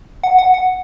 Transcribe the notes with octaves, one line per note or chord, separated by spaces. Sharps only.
F#5
F#5
F#5